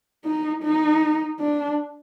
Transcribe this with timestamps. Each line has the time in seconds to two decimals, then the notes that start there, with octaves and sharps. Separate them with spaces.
0.25 D#4
0.63 D#4
1.39 D4